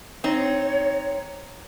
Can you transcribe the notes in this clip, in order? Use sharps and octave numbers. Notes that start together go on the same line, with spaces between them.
C4 D#4 C#5